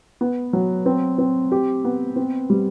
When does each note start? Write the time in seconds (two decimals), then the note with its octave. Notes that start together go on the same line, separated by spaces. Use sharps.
0.21 B3
0.53 F#3
0.86 C4
1.18 C4
1.52 G4
1.84 B3
2.16 C4
2.50 G3